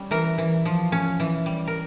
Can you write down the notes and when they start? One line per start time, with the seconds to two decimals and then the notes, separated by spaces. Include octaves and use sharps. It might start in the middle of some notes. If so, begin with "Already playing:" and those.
Already playing: G3 C#4
0.11 E3 A#4
0.38 E3
0.65 F3
0.92 C#4
1.20 E3
1.46 G3
1.68 A#4